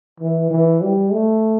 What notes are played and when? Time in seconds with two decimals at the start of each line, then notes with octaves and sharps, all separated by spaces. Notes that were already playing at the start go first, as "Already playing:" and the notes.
0.20 E3
0.51 E3
0.82 G3
1.13 A3